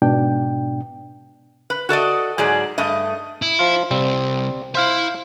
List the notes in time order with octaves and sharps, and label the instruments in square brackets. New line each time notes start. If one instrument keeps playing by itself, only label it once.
[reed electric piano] G#2 B2 D4 G5
[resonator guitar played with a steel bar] B4
F#4 A4 D5 D#5
G#2 F#3 G#4 D5
G2 A3 D#5
[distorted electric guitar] E4
[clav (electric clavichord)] F3 F4
[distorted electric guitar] C2 [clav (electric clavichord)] G3 C4
[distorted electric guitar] E4 E5 [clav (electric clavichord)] C5 F5